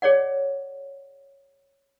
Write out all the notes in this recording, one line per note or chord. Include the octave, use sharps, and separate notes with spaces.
G#4 C#5 D5 F#5